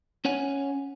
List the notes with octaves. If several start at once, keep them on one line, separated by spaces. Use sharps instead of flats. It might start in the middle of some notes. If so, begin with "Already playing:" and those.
C#4 C#5 F#5 G#5